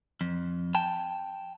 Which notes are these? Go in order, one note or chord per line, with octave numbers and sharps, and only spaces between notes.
F2
G5 A5